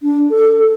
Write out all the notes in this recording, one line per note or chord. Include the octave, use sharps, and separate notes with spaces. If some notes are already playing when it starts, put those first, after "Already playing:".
D4
A4
A4